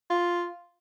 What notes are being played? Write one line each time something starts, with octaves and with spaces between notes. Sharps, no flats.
F4